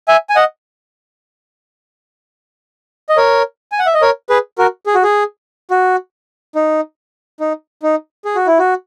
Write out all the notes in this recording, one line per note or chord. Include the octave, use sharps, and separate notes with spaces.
E5 G#5
G#5
D#5 F#5
D#5
A#4 C#5
G#5
F#5
E5
D#5
A#4 C#5
G#4 B4
F#4 A#4
G#4
F#4
G#4
F#4
D#4
D#4
D#4
G#4
F#4
E4
F#4